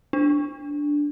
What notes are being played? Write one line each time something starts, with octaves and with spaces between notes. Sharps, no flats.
D4